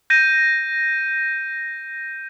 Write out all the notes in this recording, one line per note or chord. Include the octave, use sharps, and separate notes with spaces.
G6 A#6 D#7